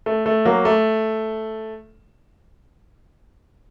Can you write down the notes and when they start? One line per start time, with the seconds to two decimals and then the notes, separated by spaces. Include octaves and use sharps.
0.06 A3
0.26 A3
0.45 F#3 A#3
0.65 A3